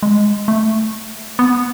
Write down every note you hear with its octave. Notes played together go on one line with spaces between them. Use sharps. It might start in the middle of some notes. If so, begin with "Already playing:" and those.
G#3
A3
B3